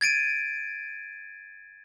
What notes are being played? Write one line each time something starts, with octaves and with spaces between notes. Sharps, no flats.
G#6 A6 D7 D#7